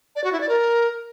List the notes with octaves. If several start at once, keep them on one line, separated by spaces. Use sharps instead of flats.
D5
F#4
E4
D5
A#4